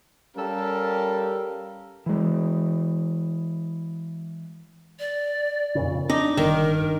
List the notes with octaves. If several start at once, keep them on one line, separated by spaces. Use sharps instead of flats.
G3 C#4 G4 A4 A#4 F5
E3 G#3
D5
F2 A#2 C#3
C4 D4 D#4 D6
G1 D#3 A#4